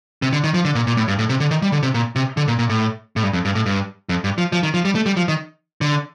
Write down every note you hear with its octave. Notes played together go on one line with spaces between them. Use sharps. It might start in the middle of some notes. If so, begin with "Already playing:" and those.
C3
D3
D#3
F3
D3
A#2
A#2
A2
G2
A2
C3
D3
D#3
G3
D3
C3
A#2
C3
D3
A#2
A#2
A2
A2
G2
F2
G2
A2
G2
F2
G2
F3
F3
D#3
F3
G3
A3
G3
F3
D#3
D3